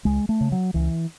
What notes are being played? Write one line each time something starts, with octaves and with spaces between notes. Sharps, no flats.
C#2 G#3
A3
C#3
F#3
C#2 E3